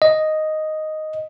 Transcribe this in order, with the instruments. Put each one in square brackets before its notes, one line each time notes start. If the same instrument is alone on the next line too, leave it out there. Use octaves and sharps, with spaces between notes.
[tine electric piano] D#5